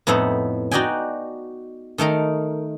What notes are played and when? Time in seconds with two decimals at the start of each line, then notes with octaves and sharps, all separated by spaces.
0.07 F2 A2 B3 D#4 E4
0.71 D#4 F#4 D5 D#5 G5 G#5
1.98 D#3 A3 D#4 A#4